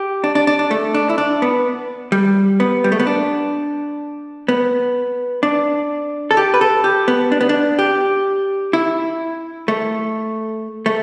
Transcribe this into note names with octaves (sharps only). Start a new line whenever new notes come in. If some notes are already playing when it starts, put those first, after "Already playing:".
Already playing: G4
D4
D4
D4
D4
A3
D4
E4
D4
B3
G3
B3
G3
A3
B3
D4
B3
D4
A4
G4
B4
A4
G4
B3
D4
B3
D4
G4
E4
A3
A3